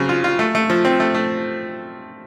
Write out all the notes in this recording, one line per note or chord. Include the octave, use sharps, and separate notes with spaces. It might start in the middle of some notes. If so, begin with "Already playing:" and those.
Already playing: C#3 F#3 C4
F4
F4
A3
A3
F3
C4
A3
A3